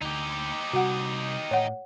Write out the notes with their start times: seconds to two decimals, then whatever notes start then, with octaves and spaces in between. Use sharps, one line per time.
0.01 D2 D#4 G4
0.73 C3 G3 F#4 F#5
1.51 A2 C#5 F#5